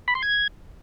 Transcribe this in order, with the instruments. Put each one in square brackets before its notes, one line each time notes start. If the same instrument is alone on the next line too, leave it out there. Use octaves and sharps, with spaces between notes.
[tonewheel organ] B5
C6
G#6